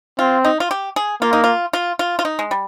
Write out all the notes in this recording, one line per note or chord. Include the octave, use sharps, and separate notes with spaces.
C4 F4
D#4
F4
G4
G#4
A#3 F4
D#4
F4
F4
F4
F4
D#4
G#3
G3